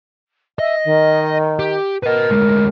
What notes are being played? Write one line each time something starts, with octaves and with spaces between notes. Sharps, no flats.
D#5 E5
D#3
G4
A#4 B4 D#5
D2 G#3